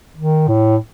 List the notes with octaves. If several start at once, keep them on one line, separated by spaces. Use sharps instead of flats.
D#3
A2